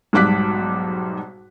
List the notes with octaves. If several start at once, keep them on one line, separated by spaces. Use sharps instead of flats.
B1 G#2 G3 D6 F#6 B6